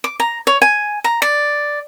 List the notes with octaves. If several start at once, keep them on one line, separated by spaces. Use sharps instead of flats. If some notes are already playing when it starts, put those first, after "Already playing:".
D6
A#5
C#5
G#5
A#5
D5